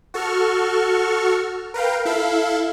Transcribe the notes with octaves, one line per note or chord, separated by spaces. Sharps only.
F#4 A4 C#6 F6
A#4 B4 F5 G5
E4 A4 E5 F5